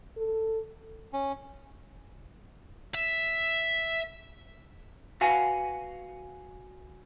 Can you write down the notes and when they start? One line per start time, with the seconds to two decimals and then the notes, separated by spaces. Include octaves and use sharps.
0.17 A4
1.13 C#4
2.94 E5
5.21 F#4 B4 F5 F#5 G#5